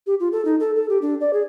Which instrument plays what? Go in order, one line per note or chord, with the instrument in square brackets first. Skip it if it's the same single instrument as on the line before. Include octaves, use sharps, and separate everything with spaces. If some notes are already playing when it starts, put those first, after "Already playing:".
[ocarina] G4
F4
A4
D#4
A4
A4
G4
D4
D5
G#4